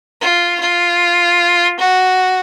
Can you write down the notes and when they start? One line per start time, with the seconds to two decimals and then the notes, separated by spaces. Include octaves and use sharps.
0.21 F4
0.60 F4
1.80 F#4